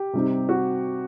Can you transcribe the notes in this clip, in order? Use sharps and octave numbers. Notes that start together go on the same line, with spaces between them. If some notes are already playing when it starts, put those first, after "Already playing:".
Already playing: G4
C3 G3 C4 D#4
F#4